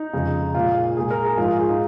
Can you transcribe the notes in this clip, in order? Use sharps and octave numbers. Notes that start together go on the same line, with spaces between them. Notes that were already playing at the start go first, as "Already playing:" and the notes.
Already playing: D#4
F2 C#3 G#3
A#2 G#3 F4
A#2 G#3 G#4
A#4
G#4
G#2 F3 G#3 F4
G#4
F4
D#4